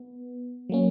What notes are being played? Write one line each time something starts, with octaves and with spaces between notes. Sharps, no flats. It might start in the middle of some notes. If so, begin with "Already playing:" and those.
Already playing: B3
F#3 A#3 C#4